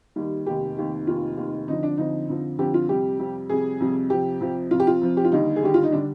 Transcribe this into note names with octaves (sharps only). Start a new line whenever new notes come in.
D#2 D#3 G3
F1 D#2 D#3 G4
F1 D#2 D#3
F1 D#2 D#3 F4
F1 D#2 D#3
F2 D3 F3 D#4
D4
F2 D3 F3 D#4
F2 D3 F3
F2 D3 F3 G4
F4
F2 C3 G3 G4
F2 C3 G3
F2 C3 G3 G#4
F2 C3 G3
F2 C3 F3 G4
F2 C3 F3
F2 C3 F3 F4
G4
F4
F2 C3 F3
G4
F4
D#2 D3 G3 D#4
G#4
D#2 D3 G3 G4
F4
D#4
D3 G3 D4